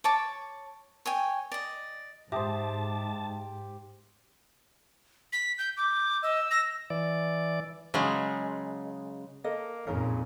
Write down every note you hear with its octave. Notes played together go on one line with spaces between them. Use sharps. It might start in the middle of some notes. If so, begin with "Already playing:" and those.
C#5 A5 D6
C#5 G5 G#5
D5 D#5
G#2 G4 C5 E5 A5 D#6
B6
G6
D6 G6
D#5 E6
A#6
E3 D5
C#3 F#3 G#3
A#3 A4 D#5
F2 A#2 C#3 D#4 A#4